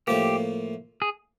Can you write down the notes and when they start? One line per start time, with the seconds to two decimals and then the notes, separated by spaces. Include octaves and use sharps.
0.07 A2 F3 A#3 G4
1.02 G#4